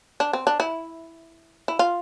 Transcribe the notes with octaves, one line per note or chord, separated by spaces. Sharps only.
D4
C4
D4
E4
E4
F4